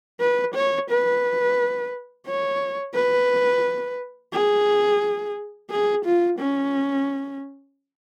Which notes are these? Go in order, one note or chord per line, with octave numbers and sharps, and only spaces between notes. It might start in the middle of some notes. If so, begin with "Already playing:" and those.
B4
C#5
B4
C#5
B4
G#4
G#4
F4
C#4